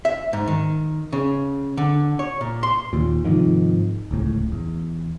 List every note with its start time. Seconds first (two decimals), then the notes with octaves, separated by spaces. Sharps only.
0.05 E5
0.33 G#2
0.48 D#3
1.13 C#3
1.77 D3
2.19 C#5
2.41 A#2
2.63 C6
2.93 D#2 A#2
3.24 G#2 C3 D#3 F3
4.11 D1 C#2 A2
4.52 E2